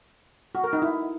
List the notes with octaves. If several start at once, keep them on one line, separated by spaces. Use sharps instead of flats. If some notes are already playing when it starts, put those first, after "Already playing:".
F#4
A#4
D#4
E4